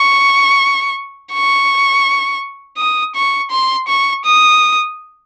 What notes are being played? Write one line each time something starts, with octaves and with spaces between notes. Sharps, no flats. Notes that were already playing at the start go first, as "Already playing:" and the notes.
Already playing: C#6
C#6
D#6
C#6
C6
C#6
D#6